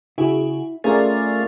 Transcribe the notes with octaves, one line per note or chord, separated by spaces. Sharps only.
C#3 E4 F#4 G#4
A3 C#4 F4 G#4 A#4 D5